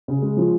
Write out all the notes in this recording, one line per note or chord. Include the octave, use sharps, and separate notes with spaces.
C#3
G#3
F3